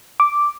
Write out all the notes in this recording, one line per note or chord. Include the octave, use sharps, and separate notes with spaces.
D6